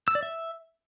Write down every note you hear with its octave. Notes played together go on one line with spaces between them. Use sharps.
E6
D5
E5